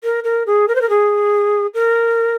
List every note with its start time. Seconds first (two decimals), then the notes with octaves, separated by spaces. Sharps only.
0.04 A#4
0.24 A#4
0.47 G#4
0.68 A#4
0.75 C5
0.81 A#4
0.90 G#4
1.74 A#4